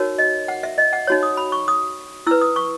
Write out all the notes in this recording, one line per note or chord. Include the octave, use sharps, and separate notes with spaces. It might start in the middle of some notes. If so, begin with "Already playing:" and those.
Already playing: D#4 F#4 A#4 C#5
D#5
F#5
E5
D#5
F#5
D#4 F#4 C#5
D#6
B5
C#6
D#6
E4 B4 E6
D#6
C#6